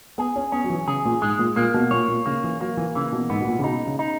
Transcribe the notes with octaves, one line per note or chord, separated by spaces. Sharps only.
B3 G#4
C#4
B3 C#4
F#3
E3
C#3 G#4
A#2
G#2 G#3
A#2
A#2 A#3
B2
A#2 C#5
A#2
C#3 A#3
E3
F#3 A#3
E3
C#3 E3
B2
G#2 B3
B2
A#2
C#3
B2 D#4
C#3
D#4